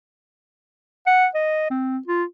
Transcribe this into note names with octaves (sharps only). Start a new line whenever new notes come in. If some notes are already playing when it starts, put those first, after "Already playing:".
F#5
D#5
C4
F4